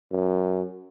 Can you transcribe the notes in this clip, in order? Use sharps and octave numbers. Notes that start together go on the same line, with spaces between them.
F#2